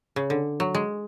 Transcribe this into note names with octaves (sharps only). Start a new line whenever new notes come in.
C#3
D3
F#3
G#3